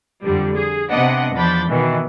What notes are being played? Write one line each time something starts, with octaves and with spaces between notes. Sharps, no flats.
F2 D3 G3
G#4
C3 B3 D4 D#5 F#5
E2 F3 D4 B5 G6 A6
B2 D#3 E3